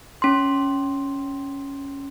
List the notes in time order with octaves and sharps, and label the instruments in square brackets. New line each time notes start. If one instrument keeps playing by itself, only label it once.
[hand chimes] C#4 C6